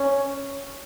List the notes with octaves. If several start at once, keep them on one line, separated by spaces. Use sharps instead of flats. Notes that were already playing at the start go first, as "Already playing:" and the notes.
Already playing: C#4